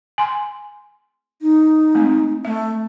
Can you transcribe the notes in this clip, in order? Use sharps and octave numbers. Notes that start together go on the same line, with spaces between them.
G#5 C6
D#4
G#3 A3 C4
A3 E5